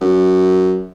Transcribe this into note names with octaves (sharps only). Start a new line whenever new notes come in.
F#2